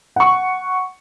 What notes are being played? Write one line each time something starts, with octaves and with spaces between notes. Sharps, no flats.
F#5 C#6